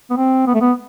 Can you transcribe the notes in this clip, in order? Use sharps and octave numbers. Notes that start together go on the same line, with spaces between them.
B3
C4
B3
A3
B3